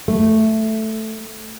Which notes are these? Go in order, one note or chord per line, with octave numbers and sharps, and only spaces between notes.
A3